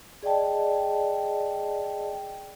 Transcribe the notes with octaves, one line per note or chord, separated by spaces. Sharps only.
G#4 D5 D#5 G5 A5